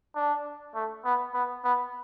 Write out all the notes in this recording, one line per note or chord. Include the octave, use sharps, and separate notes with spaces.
D4
A3
B3
B3
B3